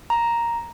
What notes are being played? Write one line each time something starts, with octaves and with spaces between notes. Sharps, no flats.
A#5